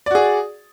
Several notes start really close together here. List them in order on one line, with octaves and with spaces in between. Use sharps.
D5 F#4 G#4